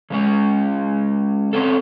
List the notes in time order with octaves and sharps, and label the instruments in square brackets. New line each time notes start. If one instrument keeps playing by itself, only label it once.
[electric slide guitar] C#3 G#3 C#4
C4 C#4 A4